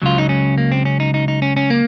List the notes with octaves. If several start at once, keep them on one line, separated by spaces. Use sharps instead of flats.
C#2 C#3 F#3 F4
D#4
C#4
A#3
C4
C#4
D#4
D#4
D#4
C#4
C#4
A#3